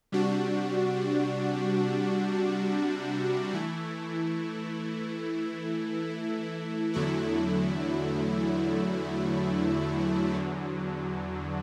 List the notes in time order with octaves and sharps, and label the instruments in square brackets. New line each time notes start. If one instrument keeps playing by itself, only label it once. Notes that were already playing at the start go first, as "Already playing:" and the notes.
[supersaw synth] C3 G3 D4 F#4
E3 A3 E4
E2 D3 F#3 A3 E4
E2 D3 F#3